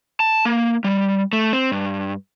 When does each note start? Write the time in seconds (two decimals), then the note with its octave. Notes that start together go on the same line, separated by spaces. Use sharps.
0.20 A5
0.45 A#3
0.84 G3
1.33 A3
1.53 C4
1.72 G2